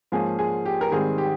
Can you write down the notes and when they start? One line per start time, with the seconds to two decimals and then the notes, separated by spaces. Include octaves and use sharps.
0.12 G#2 F3 A#3 C#4 G#4
0.39 G#4
0.66 G4
0.81 A#4
0.92 G#2 D#3 G3 C4 G#4
1.18 G4